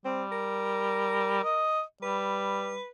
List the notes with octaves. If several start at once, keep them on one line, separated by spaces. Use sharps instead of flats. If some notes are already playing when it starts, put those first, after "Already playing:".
G3 C4
A#4
D#5
G3 B4